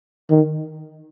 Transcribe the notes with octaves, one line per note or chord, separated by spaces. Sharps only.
D#3